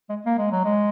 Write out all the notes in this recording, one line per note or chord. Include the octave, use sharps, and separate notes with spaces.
G#3
A#3
G#3
F#3
G#3